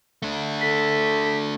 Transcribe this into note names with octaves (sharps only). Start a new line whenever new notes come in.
A3 D4
A4 B6